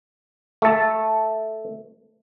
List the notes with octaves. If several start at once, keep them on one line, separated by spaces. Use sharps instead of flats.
A3 A4